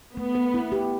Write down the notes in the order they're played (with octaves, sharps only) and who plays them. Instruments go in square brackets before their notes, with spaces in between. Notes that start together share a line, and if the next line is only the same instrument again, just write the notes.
[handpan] A3 [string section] B3
[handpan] B4
E4
G4